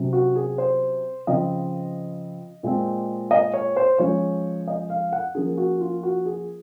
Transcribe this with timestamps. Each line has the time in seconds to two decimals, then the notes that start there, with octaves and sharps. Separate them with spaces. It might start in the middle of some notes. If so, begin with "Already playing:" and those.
Already playing: C3 F#3 C#4
0.13 F#4
0.36 G#4
0.58 C5
1.27 C#3 F3 C4 D#5
2.63 A#2 G#3 C4
3.31 D#5
3.54 C#5
3.76 C5
3.98 F3 G#3 C#4 C#5
4.68 D#5
4.90 F5
5.13 F#5
5.35 F3 A#3 C#4 G#4
5.58 F#4
5.81 F4
6.03 F#4
6.25 G#4